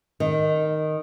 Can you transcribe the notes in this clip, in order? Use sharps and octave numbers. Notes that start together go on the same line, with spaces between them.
D#3